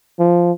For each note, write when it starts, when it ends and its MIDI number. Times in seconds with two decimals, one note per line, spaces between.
0.19 0.52 53